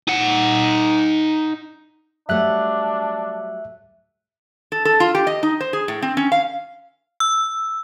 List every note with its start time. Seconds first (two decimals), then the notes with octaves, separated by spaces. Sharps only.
0.08 D#4 F#5
2.29 F#3 G3 A3 D4 E5 F#6
4.72 A4
4.85 A4
5.00 F4
5.15 G4
5.27 D#5
5.43 D#4
5.60 C5
5.73 G#4
5.88 A2
6.02 C4
6.17 C#4
6.32 F5
7.20 E6